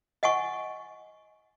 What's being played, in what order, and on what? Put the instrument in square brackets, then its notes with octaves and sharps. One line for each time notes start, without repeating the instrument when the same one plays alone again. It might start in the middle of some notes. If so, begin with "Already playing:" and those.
[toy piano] D#5 F#5 G#5 C#6